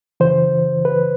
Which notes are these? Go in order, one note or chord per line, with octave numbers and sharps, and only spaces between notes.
F#2 C#3 E3 C5
B4